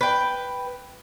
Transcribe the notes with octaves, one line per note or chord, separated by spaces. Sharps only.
B4 G5